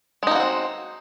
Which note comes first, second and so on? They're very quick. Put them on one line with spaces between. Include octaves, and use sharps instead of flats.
G#3 D#4 A#3 F#4 C4